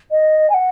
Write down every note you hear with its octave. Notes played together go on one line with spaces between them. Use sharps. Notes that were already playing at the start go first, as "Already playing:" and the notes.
D#5
G#5
F#5